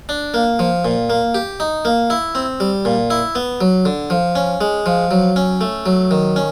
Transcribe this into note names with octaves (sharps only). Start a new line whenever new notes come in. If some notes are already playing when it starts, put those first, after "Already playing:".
D4
A#3
F3
A#2
A#3
G4
D#4
A#3
E4
C4
G3
A#2
E4
B3
F#3
D3
F3
C#4
G#3
F3
F#3
C#4
A3
F#3
D#3
C#4